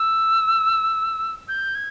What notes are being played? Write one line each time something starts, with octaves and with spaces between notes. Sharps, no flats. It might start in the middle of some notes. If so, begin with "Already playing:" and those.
Already playing: E6
G6
G#6